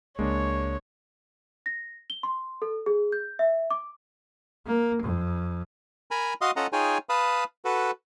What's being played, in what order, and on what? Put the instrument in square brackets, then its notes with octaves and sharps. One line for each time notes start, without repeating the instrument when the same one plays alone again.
[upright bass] C#2 [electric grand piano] G#3 A#3 D4 [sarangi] C#5
[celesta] A#6
G7
C6
A4
G#4
G6
E5
D6
[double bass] A#3
F2
[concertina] A#4 G#5 A#5 B5
F#4 D#5 F5 C6 D#6
C#4 F4 A4 D#5 F#5 A#5
D#4 F4 G#4 C#5 G5 G#5
B4 F5 A5 B5 D#6
F#4 A4 B4